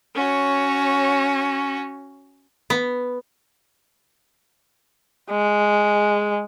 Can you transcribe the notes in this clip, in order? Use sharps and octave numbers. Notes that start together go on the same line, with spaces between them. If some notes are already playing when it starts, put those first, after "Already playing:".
C#4 F#4 C#5
B3
G#3